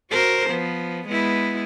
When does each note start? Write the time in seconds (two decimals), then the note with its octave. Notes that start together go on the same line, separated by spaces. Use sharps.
0.11 F#4 A#4 C5
0.48 F3 B3
1.07 G#3 B3 E4